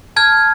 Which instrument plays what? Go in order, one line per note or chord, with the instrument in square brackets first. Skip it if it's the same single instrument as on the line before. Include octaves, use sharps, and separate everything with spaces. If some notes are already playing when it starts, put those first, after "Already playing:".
[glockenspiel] A5 F6 G#6